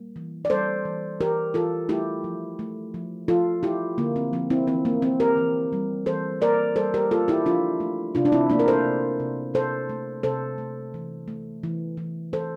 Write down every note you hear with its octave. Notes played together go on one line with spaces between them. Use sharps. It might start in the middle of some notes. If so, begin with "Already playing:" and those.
Already playing: G3 A#3
E3
D5
G3 A4 C5
E3
E3 G4 A#4
E3 F4 A4
A3 E4 G4
F3
A3
F3
F3 F4 A4
A3 E4 G4
D3 A#3
C4
F3 C4
C4 E4
E3 C4
A#3
A#3 C4
G4 A#4
E3
G3
E3 A4 C5
A#3 A#4 D5
G3 A4 C5
G4 A#4
A#3 F4 A4
E4 G4
F3 D4 F4
A3
C3 D4 F4
D4
C4 E4
A3 A#3 D4
A#4
A4 C5
C3
C3
C3 A4 C5
A3
C3 A4 C5
A3
E3
A3
E3
E3
E3 A4 C5